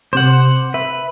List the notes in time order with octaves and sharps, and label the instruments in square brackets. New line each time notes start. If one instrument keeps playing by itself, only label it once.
[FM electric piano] C3 D6 [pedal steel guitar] C5 F#5
[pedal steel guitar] B4 [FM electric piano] E5